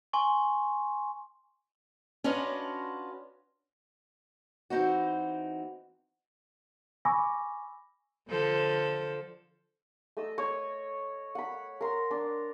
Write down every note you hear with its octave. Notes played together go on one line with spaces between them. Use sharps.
G#5 C6 C#6
C#4 D4 F4 F#4 B4 D#5
E3 C4 D#4 F#4
G#5 B5 C#6 D6 E6 A#6
D3 F3 A4
A3 D#5 E6
C#5
F#5 B5
A#4 C6
D4